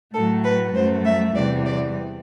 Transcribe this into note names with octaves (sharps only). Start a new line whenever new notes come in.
A2 F#3 A3 A4
B4
F#2 F#3 A3 C5
E5
E2 C3 E3 G3 D5
D5